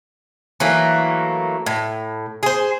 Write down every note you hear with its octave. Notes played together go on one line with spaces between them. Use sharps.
E3 F#3 A3 A#3
A2
G#4 C5